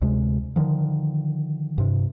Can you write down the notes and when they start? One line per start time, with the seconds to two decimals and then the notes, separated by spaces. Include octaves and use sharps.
0.02 D2 C3 G#3
0.56 D3 D#3 F3
1.78 G2 C3